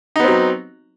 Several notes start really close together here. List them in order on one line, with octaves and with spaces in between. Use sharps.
D#4 B3 C4 F#3